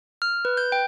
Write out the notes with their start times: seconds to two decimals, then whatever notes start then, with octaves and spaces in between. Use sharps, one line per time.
0.22 F6
0.45 B4
0.57 G6
0.72 G5